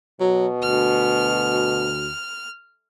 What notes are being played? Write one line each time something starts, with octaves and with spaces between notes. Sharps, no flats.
B2 F#3
D2 F6